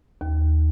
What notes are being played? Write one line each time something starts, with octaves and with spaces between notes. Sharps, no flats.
D#2